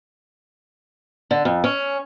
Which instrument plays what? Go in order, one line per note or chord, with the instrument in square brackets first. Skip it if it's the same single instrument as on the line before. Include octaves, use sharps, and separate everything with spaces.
[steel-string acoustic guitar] D3
F2
C#4